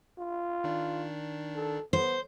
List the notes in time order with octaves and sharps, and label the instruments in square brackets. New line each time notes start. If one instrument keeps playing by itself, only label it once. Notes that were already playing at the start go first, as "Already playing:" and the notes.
[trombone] F4
[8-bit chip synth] D#3 D4
[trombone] A4
[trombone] B3 [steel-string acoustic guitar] C5